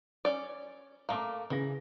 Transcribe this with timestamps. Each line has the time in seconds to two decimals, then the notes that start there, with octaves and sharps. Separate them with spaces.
0.25 C#4 D5
1.09 A3 A#3 F5 A#5 D6
1.50 C#3 E3 G#4 A#6